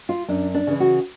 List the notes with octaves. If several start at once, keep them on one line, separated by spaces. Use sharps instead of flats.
F4
F#2 D4
D4
C#3 E3
F#4